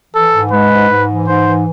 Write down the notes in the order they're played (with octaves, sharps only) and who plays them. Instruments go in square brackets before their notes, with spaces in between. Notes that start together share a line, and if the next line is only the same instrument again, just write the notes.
[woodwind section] E3 [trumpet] A4
[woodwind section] G#2
[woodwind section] G#3 [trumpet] B4
[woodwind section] G#2
G#2
E3
[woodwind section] G#2 [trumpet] C5
[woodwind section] E3